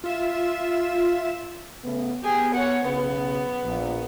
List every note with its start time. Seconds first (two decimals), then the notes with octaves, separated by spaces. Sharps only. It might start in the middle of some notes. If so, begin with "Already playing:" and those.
0.04 F4 E5 E7
1.84 C#3 A3 B3
2.22 B3 G4 G#4
2.54 C#5 F#5
2.84 B1 C#3 B3
3.64 A#1